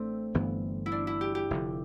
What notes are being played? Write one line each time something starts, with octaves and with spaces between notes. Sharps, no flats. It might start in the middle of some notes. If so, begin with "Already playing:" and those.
Already playing: A1 A3 C4 D4
G1 G2 E3 B3
E4
D4
E4
G4
G4
F1 F2 D3